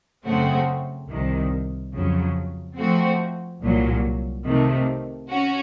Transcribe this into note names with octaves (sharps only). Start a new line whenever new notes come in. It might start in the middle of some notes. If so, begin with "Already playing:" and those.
F#2 C#3 A3 C4 F#4
C2 C3 D#3
F2 C#3 F#3
F3 A3 C4 F#4
C2 A#2 F#3
C3 D#3 A3
C#4 F#4